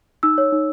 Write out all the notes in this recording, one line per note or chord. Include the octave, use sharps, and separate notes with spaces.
D#4 E6
C#5
D#4